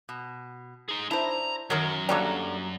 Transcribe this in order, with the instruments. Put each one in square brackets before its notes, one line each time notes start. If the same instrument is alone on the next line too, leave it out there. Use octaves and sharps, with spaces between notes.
[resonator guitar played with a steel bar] B2
[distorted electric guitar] D#4 G#4
[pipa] D4 C5 [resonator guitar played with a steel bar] E4 [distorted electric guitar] A#5
[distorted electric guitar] F#2 [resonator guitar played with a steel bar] D#3 A#4 C#5 [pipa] F#3
[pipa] D3 F#3 G3 [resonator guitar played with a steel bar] A#3 F#4 A#5